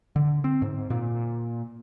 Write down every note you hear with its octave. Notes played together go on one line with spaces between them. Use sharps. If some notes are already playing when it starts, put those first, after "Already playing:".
D3
C4
G#2
A#2